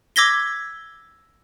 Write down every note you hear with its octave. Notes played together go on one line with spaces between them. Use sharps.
D6 E6 G#6 A#6 B6 G7